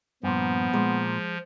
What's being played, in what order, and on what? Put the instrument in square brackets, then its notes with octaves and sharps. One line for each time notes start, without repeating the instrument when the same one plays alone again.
[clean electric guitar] G2 A#2 [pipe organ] F3 [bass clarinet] B3
[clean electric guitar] A#2 [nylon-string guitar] G#3